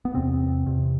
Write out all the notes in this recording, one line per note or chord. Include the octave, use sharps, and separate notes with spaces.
B3
E2 C3 C4
E2 C3